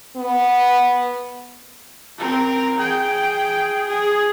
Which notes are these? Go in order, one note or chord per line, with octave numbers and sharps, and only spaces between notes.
B3
C4 A#4
G#4 G5
G#4